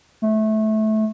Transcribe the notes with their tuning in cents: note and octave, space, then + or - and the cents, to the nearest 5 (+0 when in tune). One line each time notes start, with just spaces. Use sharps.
A3 -20